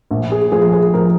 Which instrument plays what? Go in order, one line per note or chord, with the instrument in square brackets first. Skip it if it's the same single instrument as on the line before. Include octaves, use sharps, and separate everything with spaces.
[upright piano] A#1
G#4
F3 G#4
G#4
F3 A#4